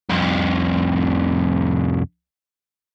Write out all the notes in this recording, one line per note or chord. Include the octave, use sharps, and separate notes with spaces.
C2 F2